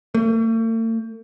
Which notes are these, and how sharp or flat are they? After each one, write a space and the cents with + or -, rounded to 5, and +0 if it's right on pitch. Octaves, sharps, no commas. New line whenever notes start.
A3 +45